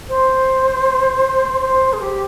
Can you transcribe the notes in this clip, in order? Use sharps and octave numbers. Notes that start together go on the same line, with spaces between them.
C5
C5
G#4
G4